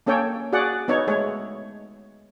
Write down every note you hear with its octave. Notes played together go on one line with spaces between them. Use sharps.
A#3 C#4 A4 C#5 G5
F#4 G#4 D5 F#5
B3 D#4 C#5
G#3 A3 C#5